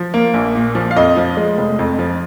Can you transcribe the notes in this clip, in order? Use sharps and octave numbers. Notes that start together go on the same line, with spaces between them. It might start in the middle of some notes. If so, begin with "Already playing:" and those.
Already playing: F3
A#3
A#1
A#2
F3
F5
F2 D#5
F3
G#3
F1
F2
F3